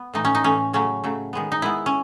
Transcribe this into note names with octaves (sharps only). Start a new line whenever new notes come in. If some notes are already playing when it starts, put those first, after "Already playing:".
Already playing: B3
A2 E3 A3 D#4
C#4
D#4
A2 E3 A3 C#4
C#3 F#3 A3 C#4
C#3 F#3 A3
D#3 G#3 B3
D#4
D#3 G#3 B3 E4
C#4